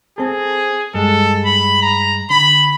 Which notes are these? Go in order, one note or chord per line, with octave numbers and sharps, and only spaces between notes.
C4 G#4 A4
G2 G#3 A4
B5
A#5
D3 B5